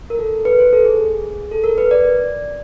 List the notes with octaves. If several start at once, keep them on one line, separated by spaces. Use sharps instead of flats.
A#4
A4
B4
C5
A4
G#4
A4
A#4
B4
D5